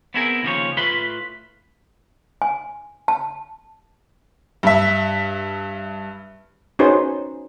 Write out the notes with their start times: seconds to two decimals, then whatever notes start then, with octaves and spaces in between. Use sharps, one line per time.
0.14 B3 C4 E4 G#4 A#4
0.43 D#2 C#3 F3 C#5
0.77 A2 F4 B4 E5 B5 C6
2.42 G#5
3.08 A5
4.63 G2 E5
6.79 C#4 D#4 F#4 G#4 B4 C5